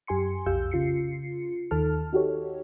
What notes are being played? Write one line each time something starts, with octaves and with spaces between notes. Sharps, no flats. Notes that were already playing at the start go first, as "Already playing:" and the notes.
F#2 G4 G#5 C6 C#7
B1 F2 G4 F5 E6 G6
C#3 F4 C7 C#7
D#2 D#3 A4 A5 F6
D#4 F#4 G4 A4 C#5